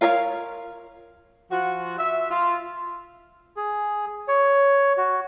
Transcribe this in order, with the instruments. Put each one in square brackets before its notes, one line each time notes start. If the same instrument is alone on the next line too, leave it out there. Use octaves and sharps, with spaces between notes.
[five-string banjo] F4 A#4 C#5 D#5 F5
[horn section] F3 F4 F#4
E5
F4
[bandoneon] G#4
C#5
F#4